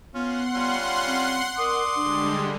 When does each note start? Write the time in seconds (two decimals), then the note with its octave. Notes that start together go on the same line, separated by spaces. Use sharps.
0.14 B3 C#4 F4 F#5 C6
0.55 G3 C#4 F4
1.06 C4
1.58 A#4 D5 C6 D#6
1.96 D3 G3 G#3 D4